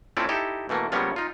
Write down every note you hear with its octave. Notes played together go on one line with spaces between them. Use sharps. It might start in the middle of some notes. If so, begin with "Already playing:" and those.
A3 C4 C#4 E4 F4 D5
D#4 E4 G4 A4
B2 E3 A3 A#3
C#3 F3 G3 A#3 B3 C#5
D#4 F4